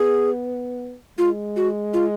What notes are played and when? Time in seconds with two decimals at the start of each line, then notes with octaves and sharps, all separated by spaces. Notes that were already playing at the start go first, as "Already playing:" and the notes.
Already playing: B3 G#4
1.18 G#3 F4
1.56 F#4
1.94 F4